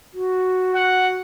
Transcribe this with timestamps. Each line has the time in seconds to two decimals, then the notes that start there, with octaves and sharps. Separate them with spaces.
0.14 F#4
0.75 F#5